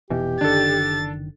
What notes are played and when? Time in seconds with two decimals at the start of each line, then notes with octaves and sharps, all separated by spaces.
0.10 F1 B2 E3 G4
0.41 F#1 D3 D#3 D4 A4 A6